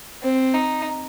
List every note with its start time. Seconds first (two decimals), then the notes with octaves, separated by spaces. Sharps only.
0.23 C4
0.54 D#4